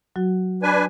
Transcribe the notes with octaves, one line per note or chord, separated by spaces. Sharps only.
F#3 F#4
D4 B4 G#5